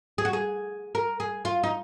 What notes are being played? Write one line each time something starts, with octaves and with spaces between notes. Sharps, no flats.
G#4
F#4
G#4
A#4
G#4
F4
D#4